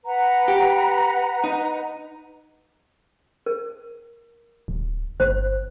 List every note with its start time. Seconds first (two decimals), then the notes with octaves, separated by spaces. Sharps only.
0.05 B4 F#5 A#5
0.48 G4
1.44 D#4
3.46 A#4
4.68 D1
5.20 G1 C5